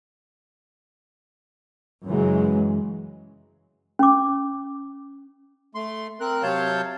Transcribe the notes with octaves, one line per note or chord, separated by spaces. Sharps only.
F#2 C#3 E3 F#3 G#3
C#4 D6
A3 C6
C4 A#4 F#6
C3 F#3 C#5 F5 A5 G6